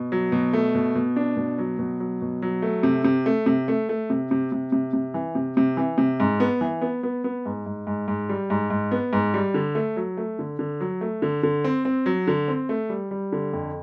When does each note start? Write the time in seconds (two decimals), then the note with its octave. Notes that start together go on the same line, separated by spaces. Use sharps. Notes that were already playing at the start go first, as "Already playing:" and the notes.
Already playing: B2
0.12 F#3
0.32 B2
0.53 A3
0.75 B2
0.95 B2
1.16 D4
1.37 B2
1.59 F#3
1.79 B2
2.00 F#3
2.22 B2
2.42 F#3
2.62 A3
2.83 C3
3.04 C3
3.26 A3
3.46 C3
3.68 A3
3.89 A3
4.10 C3
4.31 C3
4.52 C3
4.72 C3
4.93 C3
5.14 E3
5.35 C3
5.57 C3
5.77 E3
5.98 C3
6.20 G#2
6.40 B3
6.61 E3
6.82 B3
7.03 B3
7.24 B3
7.46 G#2
7.66 G#2
7.87 G#2
8.08 G#2
8.29 G3
8.50 G#2
8.70 G#2
8.91 B3
9.13 G#2
9.34 G3
9.54 D3
9.75 A3
9.97 F#3
10.17 A3
10.39 D3
10.59 D3
10.81 F#3
11.01 A3
11.22 D3
11.43 D3
11.64 C4
11.85 C4
12.06 F#3
12.27 D3
12.48 C4
12.69 A3
12.89 G3
13.11 G3
13.32 D3
13.53 F2